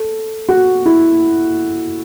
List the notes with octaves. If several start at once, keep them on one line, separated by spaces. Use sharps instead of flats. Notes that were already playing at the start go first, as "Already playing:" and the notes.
Already playing: A4
F#4
E4